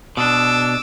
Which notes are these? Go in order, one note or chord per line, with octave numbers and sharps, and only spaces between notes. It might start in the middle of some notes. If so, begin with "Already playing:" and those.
B2 D4 D6 E6